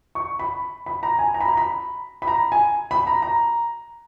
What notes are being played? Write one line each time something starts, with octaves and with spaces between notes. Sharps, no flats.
C#6
B5
B5
A#5
G#5
A#5
B5
A#5
B5
B5
A#5
G#5
B5
A#5
A#5